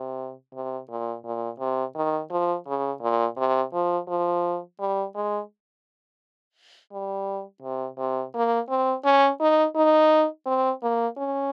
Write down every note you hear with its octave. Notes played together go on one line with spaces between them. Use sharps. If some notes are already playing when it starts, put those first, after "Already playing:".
Already playing: C3
C3
A#2
A#2
C3
D#3
F3
C#3
A#2
C3
F3
F3
G3
G#3
G3
C3
C3
A#3
C4
C#4
D#4
D#4
C4
A#3
C#4